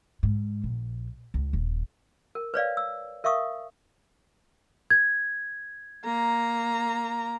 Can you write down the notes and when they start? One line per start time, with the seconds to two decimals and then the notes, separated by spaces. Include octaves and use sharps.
0.23 G#2
0.64 A#1
1.34 C#2
1.53 D#1
2.35 A#4
2.54 B4 C#5 D5 F5
2.77 E6
3.24 A#4 E5 F5 C#6 D#6
4.90 G#6
6.05 A#3 A#5